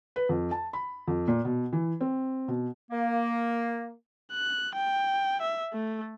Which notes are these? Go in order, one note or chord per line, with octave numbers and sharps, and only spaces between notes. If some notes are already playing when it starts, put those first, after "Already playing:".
B4
F2
A5
B5
F2
A#2
B2
E3
C4
B2
A#3
F#6
G5
E5
A3